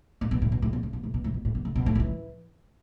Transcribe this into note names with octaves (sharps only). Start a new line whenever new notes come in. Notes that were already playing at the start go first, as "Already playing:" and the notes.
A2
B2
A2
B2
A2
B2
A2
B2
A2
B2
A2
B2
A2
B2
A2
B2
A2
F#3
E3